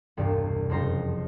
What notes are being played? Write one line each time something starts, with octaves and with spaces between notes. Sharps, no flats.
E1 C2 G2
F#1 F2 C5 A#5 C6